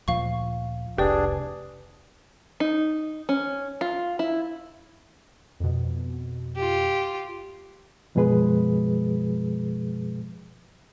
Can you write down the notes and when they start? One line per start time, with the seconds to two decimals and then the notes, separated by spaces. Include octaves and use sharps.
0.08 D2 A#2 F3 F5 C#6
0.98 F1 C2 D4 G4 G#4 B4 D5
2.60 D#4
3.29 C#4
3.81 F4
4.19 E4
5.60 F2 B2
6.56 F4 G4
8.15 F#2 B2 F3 G#3 G#4 B4